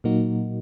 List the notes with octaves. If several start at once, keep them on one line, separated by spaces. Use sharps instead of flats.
A#2 F#3 A#3 D#4 F#4